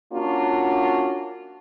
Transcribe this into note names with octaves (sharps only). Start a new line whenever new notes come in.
A#3 C#4 D4 F4 F#4